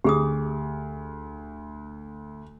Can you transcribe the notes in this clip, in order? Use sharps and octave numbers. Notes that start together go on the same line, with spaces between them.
D2 G4 G#4 D#6